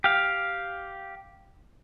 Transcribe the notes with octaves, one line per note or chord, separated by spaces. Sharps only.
G4 F5